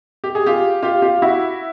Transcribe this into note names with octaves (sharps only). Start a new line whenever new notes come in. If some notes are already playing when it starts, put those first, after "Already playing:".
G4
G#4
F4 G4
F4 G4
F4 G4
E4 F#4